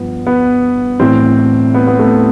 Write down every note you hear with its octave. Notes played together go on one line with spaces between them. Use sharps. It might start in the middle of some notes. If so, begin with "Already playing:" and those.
Already playing: G2 F3 B3
B3
A2 E3 C4
B3
B3
A3